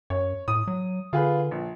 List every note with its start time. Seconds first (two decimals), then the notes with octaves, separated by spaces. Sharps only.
0.10 F#2 C#5
0.48 A2 D#6
0.67 F#3
1.13 D3 F4 G#4 B4
1.51 A#1